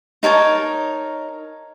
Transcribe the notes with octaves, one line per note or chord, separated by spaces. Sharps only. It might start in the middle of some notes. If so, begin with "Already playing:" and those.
D#4 A#4 C#5 A5